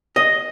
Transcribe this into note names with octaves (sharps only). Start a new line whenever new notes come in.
D#5